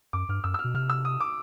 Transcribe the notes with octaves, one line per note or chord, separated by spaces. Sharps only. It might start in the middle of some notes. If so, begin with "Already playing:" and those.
F#2 D6
G2 F6
F#2 E6
E6
F6
B2
C3 F6
E6
D#6
D6